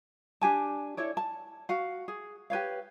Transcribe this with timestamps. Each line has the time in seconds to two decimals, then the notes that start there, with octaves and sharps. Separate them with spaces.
0.41 D4 G4 G#5 A5
0.97 E4 A4 C#5 D5
1.17 A5
1.69 F#4 F5
2.08 G#4
2.50 G4 B4 C#5 F5